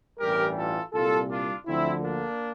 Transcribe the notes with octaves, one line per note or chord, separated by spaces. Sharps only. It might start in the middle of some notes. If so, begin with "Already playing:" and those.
A1 G2 E3 G3 G4 A#4
F4 A4
C2 A#2 G3 F4 A4
D4 F4
D2 D3 F3 C4 E4
A#3 D4